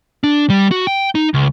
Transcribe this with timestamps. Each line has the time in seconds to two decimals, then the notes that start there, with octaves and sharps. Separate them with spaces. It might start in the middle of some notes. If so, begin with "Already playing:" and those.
0.24 D4
0.50 G3
0.71 F#4
0.87 G5
1.15 D#4
1.34 C#2